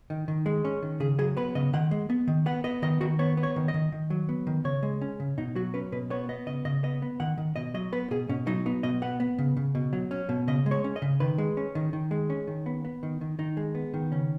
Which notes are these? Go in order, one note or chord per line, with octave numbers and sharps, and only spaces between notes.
D#3
D#3
G#3
C#4
D#3
C#3 G#4
F#3 G#4
B3 B4
C#3 D#5
D#3 F#5
G#3
B3
D#3
B3 F#5
B3 D#5
D#3 D#5
D#3 F#4
B3 C#5
B3
C#5
D#3
D#5
D#3
D#3
F#3
B3
D#3
C#3 C#5
G#3
C#4
C#3
B2 D#4
F#3 F#4
C#4 B4
B2 B4
B3 C#5
B3 D#5
C#3 D#5
C#3 D#5
B3 D#5
B3
D#3 F#5
D#3
B2 D#5
F#3 D#5
B3 B4
B2 G#4
B2 C#4
F#3 D#4
B3 D#4
B2 D#5
B3 F#5
B3
C#3
C#3
B2
F#3
C#4
B2
C#3 D#5
G#3
C#5
C#4
D#5
C#3
D#3 B4
G#3
C#4
D#3
D#3
G#3
C#4
D#3
B3
B3
D#3
D#3
D#3 D#4
G#3
B3
D#3
C#3 C#4